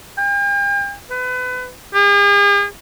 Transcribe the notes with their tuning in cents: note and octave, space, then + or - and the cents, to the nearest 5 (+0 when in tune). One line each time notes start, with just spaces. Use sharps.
G5 +45
B4 +30
G#4 -45